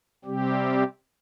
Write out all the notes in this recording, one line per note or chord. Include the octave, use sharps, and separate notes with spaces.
C3 G3 C4 G4